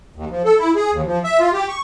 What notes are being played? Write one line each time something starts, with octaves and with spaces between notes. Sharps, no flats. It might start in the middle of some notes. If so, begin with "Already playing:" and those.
D#2
F3
A4
E4
G#4
D#2
F3
E5
F4
G4
C#6